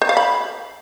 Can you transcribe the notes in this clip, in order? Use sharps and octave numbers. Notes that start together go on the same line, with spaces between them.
C5
F5
B5